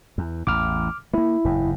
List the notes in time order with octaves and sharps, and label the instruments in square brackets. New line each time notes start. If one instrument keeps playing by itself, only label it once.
[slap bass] E2
[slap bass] A1 E2 [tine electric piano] D6 F6
[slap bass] A3 A#3 [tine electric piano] E4
[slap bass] F#1 E2 G#2